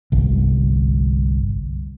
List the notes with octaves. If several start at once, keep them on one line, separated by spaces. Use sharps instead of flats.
G1 C2